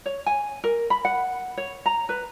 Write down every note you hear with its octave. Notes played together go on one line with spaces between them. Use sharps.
C#5
G#5
A#4
B5
F#5
C#5
A#5
B4